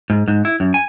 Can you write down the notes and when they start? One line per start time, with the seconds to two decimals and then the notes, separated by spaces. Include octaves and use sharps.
0.10 G#2
0.28 G#2
0.45 E4
0.60 F#2
0.74 G#5